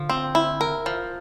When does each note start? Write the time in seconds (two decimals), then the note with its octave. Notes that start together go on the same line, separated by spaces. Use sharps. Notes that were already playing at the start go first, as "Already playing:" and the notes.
Already playing: D3 F3
0.09 C4
0.35 E4
0.61 A#4
0.86 F3